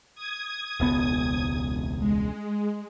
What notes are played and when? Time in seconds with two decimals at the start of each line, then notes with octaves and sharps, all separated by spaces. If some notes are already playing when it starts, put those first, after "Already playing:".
0.15 D#6 G#6
0.80 E1 C#2 B3
1.99 G#3